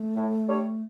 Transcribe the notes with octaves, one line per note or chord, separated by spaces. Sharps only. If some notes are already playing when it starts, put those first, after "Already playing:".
Already playing: A3
A2
G3 D4 A4 C#5